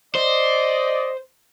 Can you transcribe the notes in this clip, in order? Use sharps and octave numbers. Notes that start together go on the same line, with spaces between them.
C5 D5 D#5